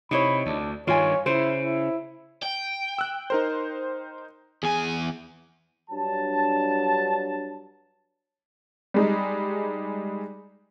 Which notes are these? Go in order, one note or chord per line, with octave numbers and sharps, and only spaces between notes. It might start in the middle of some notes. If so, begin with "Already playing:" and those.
C3 D#4 E4 C#5 B5
D2 D4
G2 D#3 F4 C#5 G#5
C#3 E4 C5
E4
G5
E6 F#6
D#4 A#4 C5
E2 G#4 G#5
G2 F#3 D4 A5
G3 G#3 D#4